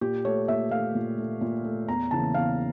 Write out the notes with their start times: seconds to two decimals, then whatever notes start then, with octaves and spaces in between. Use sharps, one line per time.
0.01 A#2 G4
0.25 A3 C#5
0.48 A#2 E5
0.71 A3 F5
0.95 A#2
1.18 A3
1.41 A#2
1.64 A3
1.88 E2 A#5
2.11 C#3 E3 A#3 A5
2.34 E2 F5